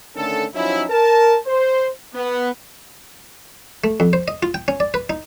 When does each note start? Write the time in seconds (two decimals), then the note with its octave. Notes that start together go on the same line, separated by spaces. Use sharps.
0.15 D3 D#3 A3 C#4 A4
0.54 F3 F#3 C#4 D#4 E4
0.89 A#4 A5
1.47 C5
2.14 B3
3.84 A3
4.00 F2
4.13 C5
4.28 D#5
4.43 F4
4.54 G5
4.68 C#4
4.80 D5
4.94 B4
5.10 D#4